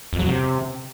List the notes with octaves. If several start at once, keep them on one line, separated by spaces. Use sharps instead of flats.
F2
F#3
C3